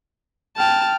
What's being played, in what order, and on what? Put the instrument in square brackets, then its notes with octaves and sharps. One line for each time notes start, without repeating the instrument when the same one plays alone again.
[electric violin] G5 F6 [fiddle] A5